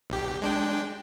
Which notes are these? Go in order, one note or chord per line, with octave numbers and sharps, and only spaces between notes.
B1 G4
G#3 D4 G5